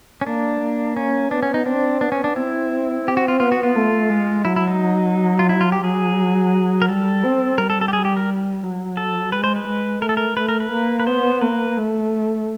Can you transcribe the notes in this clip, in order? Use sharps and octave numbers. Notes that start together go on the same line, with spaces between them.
C#4
A#3 D4
A#3
C#4
B3 D4
C#4
D#4
C4 D4
B3 D4
C#4
D4
C4 E4
C4 G4
F#4
F4
B3 F4
F#4
F4
A3
G#3
F#3 E4
E4
D#4
F4
E4
F4
G4
F#3 G#4
A#4
G3 A4
C4
G3 A#4
A4
A4
G4
G#4
G4
A#4
F#3
A4
G#3 B4
C5
B4
G#3
A3 A#4
A4
A#4
A3 B4
A#4
B4
A#3
B4
B3 C5
A#3 B4
A3